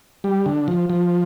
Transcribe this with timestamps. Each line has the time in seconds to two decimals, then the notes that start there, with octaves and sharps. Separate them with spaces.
0.24 G3
0.46 D3
0.68 F3
0.89 F3